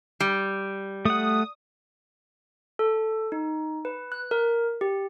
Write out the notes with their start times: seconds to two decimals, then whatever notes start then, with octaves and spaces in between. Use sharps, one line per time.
0.20 G3
1.05 A3 F#5 D#6
2.79 A4
3.32 D#4
3.85 B4
4.12 F#6
4.31 A#4
4.81 G4